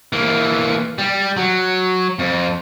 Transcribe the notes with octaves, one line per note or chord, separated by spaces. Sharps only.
E3 A#3
G3
F#3
F2